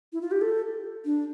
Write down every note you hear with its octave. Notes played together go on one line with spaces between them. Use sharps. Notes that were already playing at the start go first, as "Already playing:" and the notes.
E4
F4
G4
A4
D4